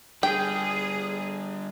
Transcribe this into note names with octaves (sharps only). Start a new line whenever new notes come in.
D3 G3 G#4 G5